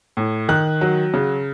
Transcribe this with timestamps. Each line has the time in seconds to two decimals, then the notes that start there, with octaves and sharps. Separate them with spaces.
0.17 A2
0.49 D#3 F#6
0.81 F#3
1.14 C#3